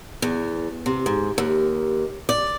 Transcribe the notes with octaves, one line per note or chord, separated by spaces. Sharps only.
E2
C3
G#2
D#2
D5